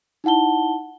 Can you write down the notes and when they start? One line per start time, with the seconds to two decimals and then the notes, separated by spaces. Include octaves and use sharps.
0.24 D#4 E4 F#5 A5 G7